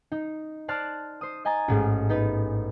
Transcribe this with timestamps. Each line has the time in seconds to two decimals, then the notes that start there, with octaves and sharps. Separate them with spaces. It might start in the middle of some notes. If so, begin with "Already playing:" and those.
0.12 D#4
0.68 C5 D5 A5 F6 F#6
1.21 C5 D#6
1.45 D#5 G#5 A#5 D#6 A6
1.68 A1 G#2 G#3
2.09 B3 D#4 B4